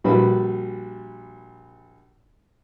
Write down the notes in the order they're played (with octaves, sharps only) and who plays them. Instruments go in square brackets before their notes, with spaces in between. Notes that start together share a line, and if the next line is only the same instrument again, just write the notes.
[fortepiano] A#1 G3 F#4 B4 B5